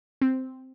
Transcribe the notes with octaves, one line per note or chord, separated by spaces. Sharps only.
C4